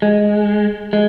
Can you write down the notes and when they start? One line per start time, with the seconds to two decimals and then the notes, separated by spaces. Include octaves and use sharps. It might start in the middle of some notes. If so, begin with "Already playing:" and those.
0.02 G#3
0.93 G#3